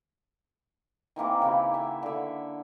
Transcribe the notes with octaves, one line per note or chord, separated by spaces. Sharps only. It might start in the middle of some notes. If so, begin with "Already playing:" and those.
D#3 E3 A#3 C4
C#3 E4 G4
E5 F#5
D3 E5